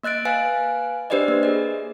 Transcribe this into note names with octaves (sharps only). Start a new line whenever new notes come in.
A#3 D#5 F#6 A6 D7
B4 F5 G#5 F#6
D4 G4 B4 C5 D5 D#5
A#3
G#4 D#5